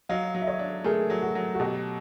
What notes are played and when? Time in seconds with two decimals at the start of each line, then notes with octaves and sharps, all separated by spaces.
0.09 F#3 D#5 F5
0.35 F#3
0.42 E5
0.47 C#5 D#5
0.59 D4
0.84 A3 G#4 A#4
1.10 F#3
1.22 F#4
1.35 F#3
1.55 F#4
1.60 B2 G4